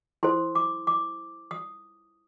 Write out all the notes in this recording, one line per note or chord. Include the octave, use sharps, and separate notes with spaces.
E4 A4 C5 C6
D6
D6
D#6